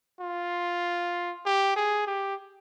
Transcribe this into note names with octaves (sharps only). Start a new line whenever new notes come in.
F4
G4
G#4
G4